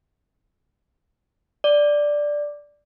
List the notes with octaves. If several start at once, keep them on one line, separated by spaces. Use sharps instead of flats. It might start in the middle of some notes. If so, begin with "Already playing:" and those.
D5